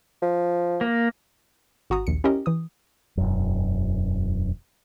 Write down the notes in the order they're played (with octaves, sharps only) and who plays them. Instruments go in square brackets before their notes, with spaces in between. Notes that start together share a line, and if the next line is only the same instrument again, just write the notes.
[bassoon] F3
[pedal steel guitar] A#3
[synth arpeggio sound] G#1 F#4 A#5 D#6
A#1 D#2 C#7
C#4 E4 G4 A#4 D#5
E3 D#6
[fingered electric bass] E1 F#2